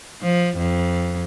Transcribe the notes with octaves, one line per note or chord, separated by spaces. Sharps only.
F3
F2